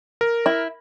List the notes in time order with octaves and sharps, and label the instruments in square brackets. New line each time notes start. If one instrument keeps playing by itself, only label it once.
[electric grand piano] A#4
[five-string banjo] E4